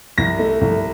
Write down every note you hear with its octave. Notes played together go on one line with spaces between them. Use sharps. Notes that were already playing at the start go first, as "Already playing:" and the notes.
C2 A#6
A3
C2